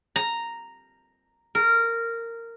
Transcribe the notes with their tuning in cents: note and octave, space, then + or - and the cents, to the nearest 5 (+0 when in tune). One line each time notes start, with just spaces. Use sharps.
A#5 -5
A#4 -15